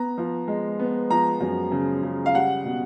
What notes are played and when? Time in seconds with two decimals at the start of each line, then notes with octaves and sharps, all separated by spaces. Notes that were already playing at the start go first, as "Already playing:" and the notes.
Already playing: B3 A#5
0.18 F3
0.48 G#3
0.79 B3
1.10 F3 A#5
1.41 F#2
1.72 C#3
2.03 C#3
2.26 F5
2.35 G3 F#5
2.65 B2